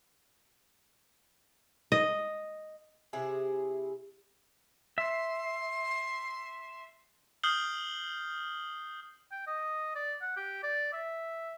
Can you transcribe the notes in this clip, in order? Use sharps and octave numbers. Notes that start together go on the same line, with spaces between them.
D#5
C3 E4 G#4
E5 C6
D#6 F6 G6 C7 F#7 G7
G5
D#5
D5
F#5
G4
D5
E5